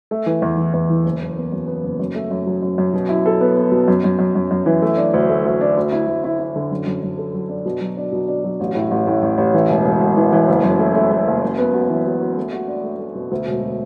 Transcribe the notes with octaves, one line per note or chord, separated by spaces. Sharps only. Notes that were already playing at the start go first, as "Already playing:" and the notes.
A3
E3
E2
E3
E2
E3
F#1
F#1
B3
F#2
B3
F#1
F#2
A3
F#2
F#3
F#2
F#2
B2
E4
A4
B3
B3
B2
F#2
F#2
F#2
F#2
F#2
E3
A3
D4
D2
A3
D2
D4
D2
E4
D2
E4
E4
D3
F#2
F#2
F#2
A4
F#3
D4
B2
F#3
D4
B2
D4
F#3
A1
A2
A1
A2
A1
A1
E3
E1
E1
E1
E3
E3
F#1
F#2
A3
A3
A3
F#1
F#2
B3
F#4
E3
F#4
F#4
A3
F#4
D4
A3
A3
B2
D2
E1